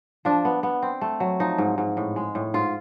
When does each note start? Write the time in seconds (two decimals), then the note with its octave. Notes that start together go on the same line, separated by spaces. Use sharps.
0.25 F3 D4
0.45 B3
0.63 B3
0.82 C4
1.01 A3
1.20 F#3
1.40 F3 D#4
1.58 G#2
1.78 G#2
1.97 A2
2.16 G#3
2.35 A2
2.54 G#2 F4